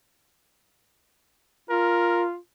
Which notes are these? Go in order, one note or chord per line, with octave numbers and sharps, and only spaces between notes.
F4 A#4